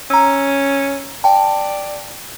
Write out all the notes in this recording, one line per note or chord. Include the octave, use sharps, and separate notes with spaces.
C#4 A#5 E6
D5 G5 A5